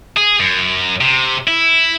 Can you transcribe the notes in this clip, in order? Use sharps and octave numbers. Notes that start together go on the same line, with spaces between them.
G#4
F#2
C3
E4